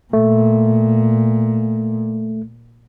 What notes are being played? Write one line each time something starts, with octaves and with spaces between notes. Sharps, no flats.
A#2 A3